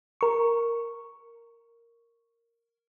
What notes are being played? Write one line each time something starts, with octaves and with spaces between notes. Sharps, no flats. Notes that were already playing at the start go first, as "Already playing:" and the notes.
A#4 C#6